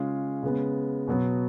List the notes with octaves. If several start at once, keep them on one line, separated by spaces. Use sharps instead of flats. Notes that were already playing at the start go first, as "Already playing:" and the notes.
Already playing: C#3 G#3 C#4 F4 G#4
C#3 G#3 B3
B2 F#3 B3